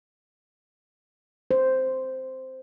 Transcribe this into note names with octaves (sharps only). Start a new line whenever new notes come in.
C5